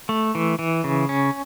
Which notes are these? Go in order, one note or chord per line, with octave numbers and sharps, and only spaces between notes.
A3
E3
E3
C#3
C#4